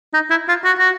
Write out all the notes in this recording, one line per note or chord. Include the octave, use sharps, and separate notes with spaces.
D#4
E4
F4
F#4
F#4